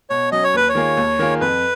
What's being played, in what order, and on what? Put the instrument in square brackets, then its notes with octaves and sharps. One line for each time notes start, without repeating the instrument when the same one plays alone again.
[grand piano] B2 [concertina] C#5
[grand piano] F#3 C#4 [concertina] D#5
[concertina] C#5
[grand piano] D#2 [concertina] B4
[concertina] C#5
[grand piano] D#3 A#3 F4 G#4
D#2
D#3 A#3 F4 G#4
[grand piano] F2 [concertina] B4